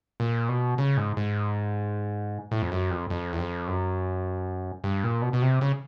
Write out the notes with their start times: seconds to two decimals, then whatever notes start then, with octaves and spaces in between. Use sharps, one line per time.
0.20 A#2
0.49 B2
0.78 C#3
0.97 G#2
1.17 G#2
2.51 A2
2.62 F2
2.71 F#2
2.90 F2
3.10 F2
3.32 E2
3.39 F2
3.67 F#2
4.84 G2
5.03 A#2
5.22 B2
5.33 B2
5.42 C3
5.61 C#3